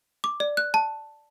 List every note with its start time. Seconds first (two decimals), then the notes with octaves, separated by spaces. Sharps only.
0.24 D6
0.40 D5
0.57 F#6
0.74 A5